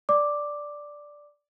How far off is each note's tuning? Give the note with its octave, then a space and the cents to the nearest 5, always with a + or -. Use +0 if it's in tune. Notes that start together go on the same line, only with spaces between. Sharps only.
D5 +0 D6 +0